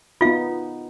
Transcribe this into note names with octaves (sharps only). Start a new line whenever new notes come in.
B3 D#4 F4 F5